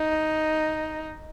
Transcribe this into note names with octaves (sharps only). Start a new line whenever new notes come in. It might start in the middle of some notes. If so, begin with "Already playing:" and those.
Already playing: D#4